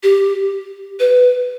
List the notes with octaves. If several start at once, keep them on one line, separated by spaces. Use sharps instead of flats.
G4
B4